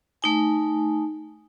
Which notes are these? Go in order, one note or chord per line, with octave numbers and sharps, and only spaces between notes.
A3 D#4 G#5